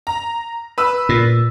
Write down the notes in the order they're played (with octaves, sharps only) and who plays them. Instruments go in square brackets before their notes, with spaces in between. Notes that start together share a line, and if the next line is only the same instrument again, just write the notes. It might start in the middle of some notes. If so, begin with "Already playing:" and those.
[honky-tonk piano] A#5
B4 E6
[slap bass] A#2